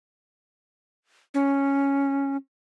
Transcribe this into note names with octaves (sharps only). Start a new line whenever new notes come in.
C#4